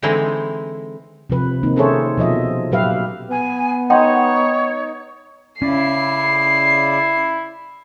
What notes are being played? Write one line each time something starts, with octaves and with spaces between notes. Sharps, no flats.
D3 E3 G#3 C4 D#4 E4
C3 F3 B4
D#3 A#3 C4 D#4
C#4 G#4 A4 C5 C#5 E5
B2 F3 D#5 E5
A#2 F#3 G4 B4 E5 F5
B3 G#5
D#4 C#5 F#5 G5 C6
C#3 C#4 E4 D5 C7